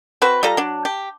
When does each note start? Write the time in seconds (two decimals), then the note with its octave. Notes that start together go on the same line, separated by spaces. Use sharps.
0.22 C4 F#4 B4
0.43 G3 F4 A4 A#5
0.57 F#3 D4
0.85 G4